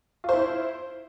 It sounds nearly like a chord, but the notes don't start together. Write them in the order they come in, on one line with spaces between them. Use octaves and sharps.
F4 C5 E4